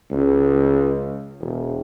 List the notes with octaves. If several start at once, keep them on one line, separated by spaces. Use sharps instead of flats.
C#2
E1